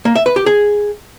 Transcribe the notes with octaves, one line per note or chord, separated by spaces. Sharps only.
A#3
E5
B4
G4
G#4